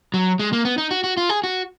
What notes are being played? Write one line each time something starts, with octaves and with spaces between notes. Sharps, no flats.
F#3
G#3
A#3
B3
D#4
F#4
F#4
F4
G#4
F#4